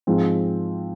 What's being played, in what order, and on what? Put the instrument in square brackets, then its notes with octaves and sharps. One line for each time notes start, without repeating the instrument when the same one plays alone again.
[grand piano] G#2 F3 G#3 C4